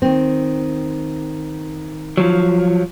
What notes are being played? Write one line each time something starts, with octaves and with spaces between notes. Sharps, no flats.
D#3 C4
F3 F#3